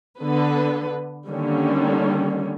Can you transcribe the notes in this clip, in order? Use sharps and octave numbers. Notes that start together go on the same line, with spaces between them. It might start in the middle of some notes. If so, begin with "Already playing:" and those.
D3 B3 B4
D3 D#3 G3 A#3 C#4